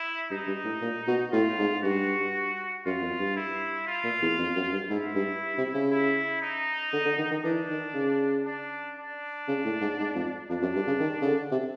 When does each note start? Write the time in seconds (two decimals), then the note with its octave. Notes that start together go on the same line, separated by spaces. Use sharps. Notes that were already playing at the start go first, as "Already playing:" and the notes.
Already playing: E4
0.30 G2 D#4
0.47 G2
0.64 A2
0.82 A#2
1.07 B2
1.32 A2 F4
1.59 G#2
1.83 G2 F#4
2.85 F#2 F4
3.02 F2
3.20 G2
3.36 E4
3.87 F4
4.04 A#2
4.22 E2
4.38 F2
4.56 F#2
4.72 G2
4.89 G#2 E4
5.15 G2
5.58 C3
5.74 C#3
5.91 E4
6.42 D#4
6.93 D3
7.05 D3
7.18 D#3
7.31 D#3
7.44 E3 D4
7.70 D#3
7.94 C#3
8.45 D4
8.97 D4
9.48 C#3
9.64 A2
9.81 G#2
9.99 G#2
10.15 F2
10.50 F2 D4
10.62 F#2
10.76 G2
10.87 C#3
11.00 D#3
11.22 C#3
11.26 D3
11.52 C3